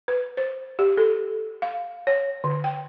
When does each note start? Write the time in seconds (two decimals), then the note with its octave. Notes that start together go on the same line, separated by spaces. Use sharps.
0.08 B4
0.37 C5
0.79 G4
0.97 A4
1.62 F5
2.07 C#5
2.44 D3
2.64 G5